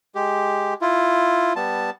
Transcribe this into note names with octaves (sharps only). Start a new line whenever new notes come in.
G#3 G4
E4 F4
G3 B3 A5